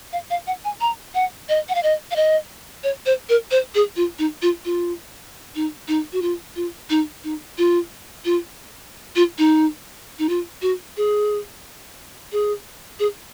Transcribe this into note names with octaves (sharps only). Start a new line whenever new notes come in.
F5
F5
F#5
G#5
A#5
F#5
D#5
F#5
F5
D#5
F5
D#5
C#5
C5
A#4
C5
G#4
F4
D#4
F4
F4
D#4
D#4
F#4
F4
F4
D#4
D#4
F4
F4
F4
D#4
D#4
F4
F#4
G#4
G#4
G#4